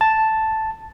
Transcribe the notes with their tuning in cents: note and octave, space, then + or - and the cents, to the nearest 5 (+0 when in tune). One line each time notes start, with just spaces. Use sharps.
A5 +0